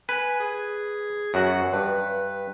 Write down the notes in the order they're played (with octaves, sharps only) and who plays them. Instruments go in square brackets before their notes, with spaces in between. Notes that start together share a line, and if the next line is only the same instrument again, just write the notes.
[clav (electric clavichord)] B4 [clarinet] G#5
[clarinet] G#4
[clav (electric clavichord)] F#2 F#4 [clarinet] F#5
[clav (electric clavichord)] G2 [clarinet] B4